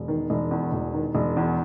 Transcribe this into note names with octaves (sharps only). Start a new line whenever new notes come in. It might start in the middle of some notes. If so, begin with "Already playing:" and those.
Already playing: E1
D#3
E1
E2
E1
D#3
E1
E2